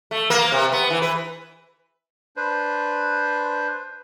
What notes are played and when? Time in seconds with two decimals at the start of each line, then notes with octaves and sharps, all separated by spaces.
0.11 A3
0.30 A#3
0.52 C3
0.72 B3
0.90 E3
1.02 B4
2.36 D4 B4 C5